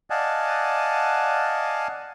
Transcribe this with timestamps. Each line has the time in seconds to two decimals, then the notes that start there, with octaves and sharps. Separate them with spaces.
0.10 D5 D#5 F5 F#5 G#5 A5